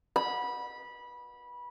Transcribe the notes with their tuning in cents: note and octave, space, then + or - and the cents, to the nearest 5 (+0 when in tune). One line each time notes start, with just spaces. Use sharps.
B5 -20